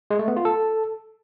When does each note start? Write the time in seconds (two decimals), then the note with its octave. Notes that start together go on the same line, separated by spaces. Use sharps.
0.11 G#3
0.19 A3
0.28 B3
0.36 F4
0.45 A4